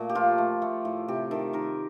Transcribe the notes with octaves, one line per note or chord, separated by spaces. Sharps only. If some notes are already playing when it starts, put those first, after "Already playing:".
Already playing: A#2 A3
G4
F3 F4
A3
A3
A2
C3 G4
D#3 A4
D#3 A#4